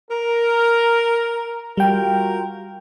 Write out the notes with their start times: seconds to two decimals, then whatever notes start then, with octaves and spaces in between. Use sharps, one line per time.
0.11 A#4
1.77 G3 F4 F#4 A#4 G5